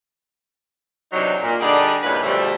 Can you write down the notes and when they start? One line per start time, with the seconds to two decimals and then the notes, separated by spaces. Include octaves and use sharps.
1.13 E2 C3 F#3 D4 D#4
1.41 A#2
1.60 D3 G3 D4 D#4 G#4 D5
2.03 E2 G2 A#2 C#3 G#3 B4
2.23 D2 B2 F3 G3 A3